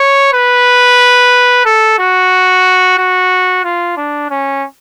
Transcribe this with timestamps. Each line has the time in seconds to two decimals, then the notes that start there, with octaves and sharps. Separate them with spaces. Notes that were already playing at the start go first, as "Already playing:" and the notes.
Already playing: C#5
0.34 B4
1.65 A4
1.99 F#4
2.98 F#4
3.65 F4
3.97 D4
4.30 C#4